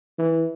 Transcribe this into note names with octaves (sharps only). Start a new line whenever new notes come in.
E3